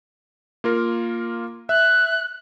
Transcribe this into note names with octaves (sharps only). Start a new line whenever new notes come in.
A#3 F4 A#4
E5 F#6